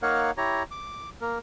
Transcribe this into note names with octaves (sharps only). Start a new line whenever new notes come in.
A#3 D#4 A#4 C#5 F5 F#5
E4 G4 C#5 A#5
D6
A#3 A#4